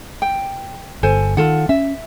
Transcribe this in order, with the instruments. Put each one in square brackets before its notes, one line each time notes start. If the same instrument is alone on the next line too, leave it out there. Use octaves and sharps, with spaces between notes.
[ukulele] G5
[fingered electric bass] G1 [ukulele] A4 C5 G#5
[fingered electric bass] D#3 [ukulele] F4 A4 F#5
[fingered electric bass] C#4 [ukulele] E5